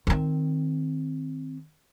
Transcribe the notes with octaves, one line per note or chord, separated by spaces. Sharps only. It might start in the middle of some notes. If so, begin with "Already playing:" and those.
D#3 C4